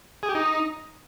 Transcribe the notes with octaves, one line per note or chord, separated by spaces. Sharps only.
G#4
G4
D#4